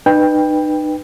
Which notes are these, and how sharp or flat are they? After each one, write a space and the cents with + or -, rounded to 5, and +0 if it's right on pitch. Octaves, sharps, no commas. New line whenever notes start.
D#4 -40 B4 +0 G5 +15